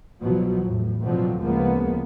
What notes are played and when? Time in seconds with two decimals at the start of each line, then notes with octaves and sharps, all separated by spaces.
0.20 C2 B2 F3 F#3
0.66 E2 A2
1.03 B2 D3 F3 F#3 C4
1.42 D2 C#3 F3 G#3 A#3 B3